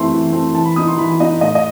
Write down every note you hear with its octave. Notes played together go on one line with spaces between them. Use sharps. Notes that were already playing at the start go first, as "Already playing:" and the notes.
Already playing: E3 A3 C4 C6
E3
A3 C4
E3 A5
B5
B3 D#4 D#6
C6
E3 B5
B3 D#4 D#5
A2 D#5
D#5